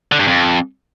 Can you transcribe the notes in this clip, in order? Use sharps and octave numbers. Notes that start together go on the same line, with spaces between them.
D3
G2
F2